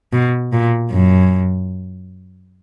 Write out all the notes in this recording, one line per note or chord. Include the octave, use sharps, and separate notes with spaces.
B2
A#2
F#2